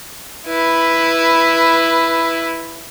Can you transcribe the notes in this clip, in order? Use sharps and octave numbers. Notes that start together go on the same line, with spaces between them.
E4 B4